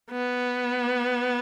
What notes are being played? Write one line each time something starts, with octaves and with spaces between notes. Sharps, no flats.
B3